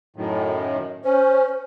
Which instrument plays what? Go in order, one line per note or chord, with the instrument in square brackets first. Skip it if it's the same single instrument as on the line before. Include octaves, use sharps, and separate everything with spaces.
[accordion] F#2 A2 D#3
[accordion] C#4 [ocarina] C5